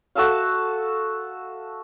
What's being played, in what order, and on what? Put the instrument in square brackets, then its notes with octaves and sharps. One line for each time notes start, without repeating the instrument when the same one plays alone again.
[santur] F#4 A4 E5 F5